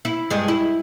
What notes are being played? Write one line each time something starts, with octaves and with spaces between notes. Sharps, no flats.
E4
G2 G#3
E4